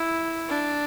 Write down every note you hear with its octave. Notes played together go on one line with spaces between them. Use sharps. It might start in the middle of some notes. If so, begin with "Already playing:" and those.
Already playing: E4
D4